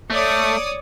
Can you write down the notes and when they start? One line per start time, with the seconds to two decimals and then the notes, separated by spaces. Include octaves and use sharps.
0.10 A3 C#5 D5 D#6